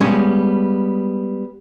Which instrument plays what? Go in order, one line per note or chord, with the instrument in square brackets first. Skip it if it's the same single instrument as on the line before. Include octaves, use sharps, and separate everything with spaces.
[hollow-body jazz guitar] G3 G#3 B3 C#4